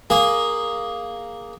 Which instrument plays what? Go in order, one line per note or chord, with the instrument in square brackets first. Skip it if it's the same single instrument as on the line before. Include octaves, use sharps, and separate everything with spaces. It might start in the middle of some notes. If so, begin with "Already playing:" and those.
[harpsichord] A#3 G#4